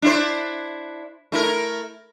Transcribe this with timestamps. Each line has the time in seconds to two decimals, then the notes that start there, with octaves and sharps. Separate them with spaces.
0.02 D4 E4 C5
1.32 A3 E4 A#4